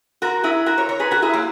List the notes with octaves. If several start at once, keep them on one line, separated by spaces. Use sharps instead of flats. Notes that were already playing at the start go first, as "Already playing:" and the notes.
F#4 A#4
E4 G#4
F#4 A#4
A#4 C#5
A#4 C#5
G#4 B4
F#4 A#4
E4 G#4
F#3 A#3